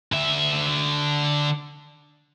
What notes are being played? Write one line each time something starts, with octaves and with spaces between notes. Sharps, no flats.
D3 E5